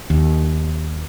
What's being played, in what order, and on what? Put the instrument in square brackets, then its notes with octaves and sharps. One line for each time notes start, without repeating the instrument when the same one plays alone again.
[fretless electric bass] D#2